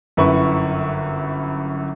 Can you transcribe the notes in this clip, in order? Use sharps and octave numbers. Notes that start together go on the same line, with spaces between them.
G1 F#2 E4 B4 C#6